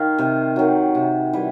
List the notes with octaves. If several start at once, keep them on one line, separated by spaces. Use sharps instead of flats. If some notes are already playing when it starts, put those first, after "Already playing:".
Already playing: D#3 F5
C3
D#3 F#3
C3
E3 G3